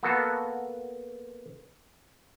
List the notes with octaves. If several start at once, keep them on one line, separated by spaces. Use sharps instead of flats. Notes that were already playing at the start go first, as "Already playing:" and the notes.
A#3 B3 F#4 A4